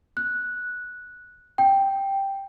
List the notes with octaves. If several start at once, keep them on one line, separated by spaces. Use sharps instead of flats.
F#6
G5